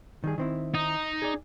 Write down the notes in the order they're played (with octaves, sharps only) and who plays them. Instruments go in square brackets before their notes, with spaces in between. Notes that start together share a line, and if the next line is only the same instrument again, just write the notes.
[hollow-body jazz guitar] D#3 G3 G#4
D#3 C4 E4
[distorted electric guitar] D#4
[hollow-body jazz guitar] G#4 D5